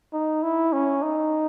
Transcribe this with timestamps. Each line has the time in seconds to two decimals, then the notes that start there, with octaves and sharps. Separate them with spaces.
0.13 D#4
0.43 E4
0.73 C#4
1.02 D#4